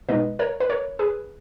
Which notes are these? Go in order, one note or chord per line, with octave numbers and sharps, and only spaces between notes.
B2 G#3 B3 D#4 B4 D#5
A#4 C#5
B4
A#4 C#5
G#4 B4